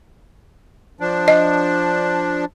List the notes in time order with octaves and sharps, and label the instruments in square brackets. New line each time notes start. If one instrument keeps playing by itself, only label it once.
[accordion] F3 D4
[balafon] D#5